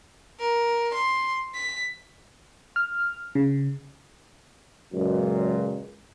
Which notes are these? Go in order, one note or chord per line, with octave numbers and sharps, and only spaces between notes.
A#4
C6
B6
F6
C#3
C#2 F#2 A#2